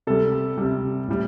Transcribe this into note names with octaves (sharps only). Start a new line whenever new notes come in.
C3 G3 A4
C3 G3
A2 G3